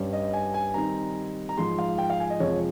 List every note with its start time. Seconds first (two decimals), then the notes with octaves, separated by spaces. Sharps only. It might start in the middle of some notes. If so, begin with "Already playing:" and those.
Already playing: G2 G3 C#4
0.13 D#5
0.33 G#5
0.54 G#5
0.74 D#3 G3 C4 D#4 A#5
1.49 A#5
1.57 G#2 F3 G#3 C6
1.78 F5
1.98 G5
2.10 F5
2.20 G#5
2.30 D#5
2.40 F2 C3 F3 G#3 C#5